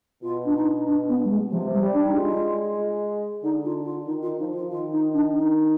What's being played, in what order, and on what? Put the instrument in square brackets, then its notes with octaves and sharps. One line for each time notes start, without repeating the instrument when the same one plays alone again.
[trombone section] B2 [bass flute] F4
[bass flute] D4
D#4
D4
B3
G3
G#3
[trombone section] C3 [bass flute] F3
[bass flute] G3
[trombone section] G3
[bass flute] D4
D#4
[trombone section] G#3 [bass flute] F4
[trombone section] D3 [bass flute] D#4
[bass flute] F4
F4
[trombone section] D#3 [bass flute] D#4
[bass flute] F4
[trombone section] F3 [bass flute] D#4
[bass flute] F4
[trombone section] D#3 [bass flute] F4
[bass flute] D#4
D4
D#4